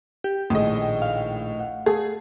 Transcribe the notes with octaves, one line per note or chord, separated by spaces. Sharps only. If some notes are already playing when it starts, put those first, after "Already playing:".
G4
A#1 A2 D#3 G#4 D#5 D#6
F5
F#5
A3 G#4